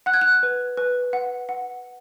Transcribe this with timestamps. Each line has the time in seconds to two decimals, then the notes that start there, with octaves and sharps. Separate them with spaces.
0.06 F#5 F#6
0.14 G#6
0.21 F#6
0.43 B4
0.77 B4
1.13 F#5
1.49 F#5